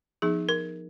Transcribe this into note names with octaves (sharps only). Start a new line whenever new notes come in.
F3 B3 D#4 G#4
A#4